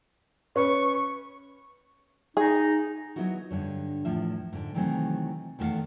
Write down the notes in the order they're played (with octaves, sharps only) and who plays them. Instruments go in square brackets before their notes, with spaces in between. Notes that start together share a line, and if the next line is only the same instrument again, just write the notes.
[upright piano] C#4 B4 [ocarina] C#6
[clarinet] D#4 [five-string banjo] G#4
[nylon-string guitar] F#3 G3 B3 D#4 E4 F#4
G2 D3 C#5
E2 A2 F3 E5
G#2 D3
C3 D#3 E3 F#3 A3 C4
E2 D#3 A3 F#4 F5 F#5